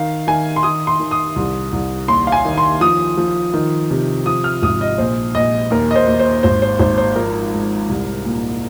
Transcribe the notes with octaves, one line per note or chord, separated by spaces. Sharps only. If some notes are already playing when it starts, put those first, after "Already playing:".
Already playing: D#3 F5
D#3 G#5
C6
D#3 D#6
C6
D#3
D#6
C2
C2
D#2 C6
F5
G#5
D#3
C6
F3 D#6
F3
D#3
C3
F3 D#6
F6
G#1 D#6
D#5
A#1 C5
A#1 D#5
D#2 A#4
D#5
C5
D#2
C5
G#1 C5
C5
G#1 C5
C5
F3 A#4
G#2
C2
A#2